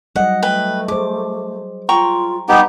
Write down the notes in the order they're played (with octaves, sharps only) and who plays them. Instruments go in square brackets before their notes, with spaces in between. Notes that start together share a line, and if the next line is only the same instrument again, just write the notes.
[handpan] F#3 G3 D#5 [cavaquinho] F#5
[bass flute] A3 [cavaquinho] B4 G5
[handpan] G#4 C5 [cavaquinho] D6
[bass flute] F4 [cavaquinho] G5 A#5 C#6
[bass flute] G3 [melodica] B3 D#4 G4